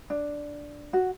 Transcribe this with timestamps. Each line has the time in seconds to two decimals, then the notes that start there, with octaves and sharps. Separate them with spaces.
0.10 D4
0.93 F#4